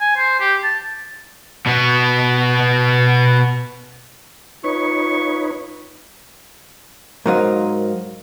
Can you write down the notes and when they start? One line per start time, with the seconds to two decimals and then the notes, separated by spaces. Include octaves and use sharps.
0.01 G#5
0.17 C5
0.40 G4
0.64 A5
1.66 B2 B3
4.64 D#4 F4 B4 C#5 C#6
7.26 G#2 F#3 D#4 A#4 C5 F5